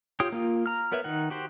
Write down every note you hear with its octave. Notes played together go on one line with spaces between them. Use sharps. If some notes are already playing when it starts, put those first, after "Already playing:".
F4 G4 C#5 G5 D#6
A#3 F4
A#5 F6
B3 A#4 B4 C#5 E5
D#3 D#4 F#5
F#4 G4 C5